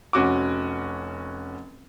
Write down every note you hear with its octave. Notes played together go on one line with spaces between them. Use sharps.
F1 C#4 F#4 D6